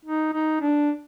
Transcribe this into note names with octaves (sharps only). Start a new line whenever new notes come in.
D#4
D#4
D4